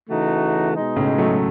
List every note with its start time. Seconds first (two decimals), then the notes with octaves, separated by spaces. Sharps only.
0.08 C#3 E3 A3 D#4 F#4
0.74 B2 G#3 D#4
0.96 A2 C#3
1.18 F#3 A3